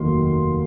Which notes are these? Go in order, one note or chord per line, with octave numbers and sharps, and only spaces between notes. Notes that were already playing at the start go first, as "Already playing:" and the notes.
Already playing: F1 D#2 D#3 F#3 A#3 C6